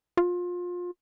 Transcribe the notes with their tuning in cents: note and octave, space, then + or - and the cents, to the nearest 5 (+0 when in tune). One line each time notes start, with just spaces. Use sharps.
F4 +25